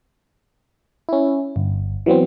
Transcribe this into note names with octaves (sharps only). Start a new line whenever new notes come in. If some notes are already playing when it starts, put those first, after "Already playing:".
C#4 E4
G1
E3 F#3 B3 C4